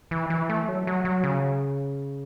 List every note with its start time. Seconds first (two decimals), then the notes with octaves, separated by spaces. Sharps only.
0.11 E3
0.30 E3
0.50 A3
0.69 F#3
0.87 F#3
1.05 F#3
1.24 C#3